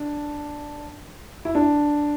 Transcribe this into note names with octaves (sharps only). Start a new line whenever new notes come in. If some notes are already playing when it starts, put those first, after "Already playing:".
Already playing: D4
E4
D4